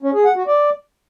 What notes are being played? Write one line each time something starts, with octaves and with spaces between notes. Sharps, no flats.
C#4
G#4
F#5
F#4
D5